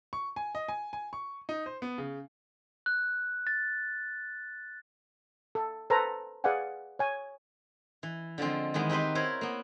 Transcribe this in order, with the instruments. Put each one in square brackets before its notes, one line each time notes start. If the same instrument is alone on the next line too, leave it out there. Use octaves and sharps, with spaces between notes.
[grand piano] C#6
G#5
D#5
G#5
G#5
C#6
D#4
C5
B3
C#3
[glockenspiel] F#6
A6
[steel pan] A4
A4 B4 C5 A#5
G#4 B4 D5 F5 F#5 G#5
C#5 G#5
[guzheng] E3
D3 F3 G#3 C4
D#3 E3 G#3 B3
C4 D#4 G4 B4 C5
E4 A#4 C5 C#5 F#5
A#3 B3